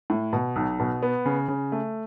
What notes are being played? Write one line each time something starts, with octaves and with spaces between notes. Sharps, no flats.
A2
B2
B1
B2
B3
C#3
C#3
A3